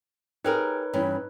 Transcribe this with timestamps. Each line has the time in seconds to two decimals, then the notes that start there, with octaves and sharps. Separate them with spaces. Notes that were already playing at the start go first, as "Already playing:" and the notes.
0.44 D#4 G4 G#4 A#4 B4 C#5
0.94 G2 E3 C#4